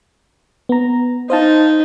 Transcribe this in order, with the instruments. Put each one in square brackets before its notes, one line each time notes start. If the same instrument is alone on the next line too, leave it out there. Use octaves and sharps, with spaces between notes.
[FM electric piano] B3 A#5
[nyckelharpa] D#4 [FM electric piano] C5 F5 A5